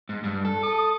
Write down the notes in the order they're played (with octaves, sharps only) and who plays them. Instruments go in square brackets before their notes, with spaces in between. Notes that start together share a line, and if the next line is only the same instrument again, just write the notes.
[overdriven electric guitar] G#2
G2
A4
[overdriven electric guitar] A4 [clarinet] D#6